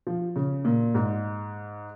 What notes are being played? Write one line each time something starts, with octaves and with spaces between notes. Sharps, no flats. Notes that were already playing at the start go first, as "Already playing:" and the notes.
F3
C#3
A#2
G#2